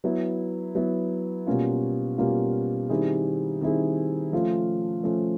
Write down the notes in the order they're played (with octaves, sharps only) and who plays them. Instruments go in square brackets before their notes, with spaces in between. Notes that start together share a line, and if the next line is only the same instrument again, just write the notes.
[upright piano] F#3 B3 E4
F#3 B3 E4
B2 G3 A#3 C#4 F4
B2 G3 A#3 C#4 F4
D#3 G3 C4 E4 G#4
D#3 G3 C4 E4 G#4
F3 A3 C#4 F4
F3 A3 C#4 F4